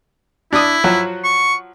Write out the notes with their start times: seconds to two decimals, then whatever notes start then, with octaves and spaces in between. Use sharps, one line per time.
0.53 D4 E4 D#6
0.84 F3 F#3 F#4
1.24 C#6